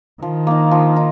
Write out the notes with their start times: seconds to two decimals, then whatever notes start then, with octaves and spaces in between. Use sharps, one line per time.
0.22 D#3 F3
0.47 A#3 D#4
0.71 F3
0.96 D#4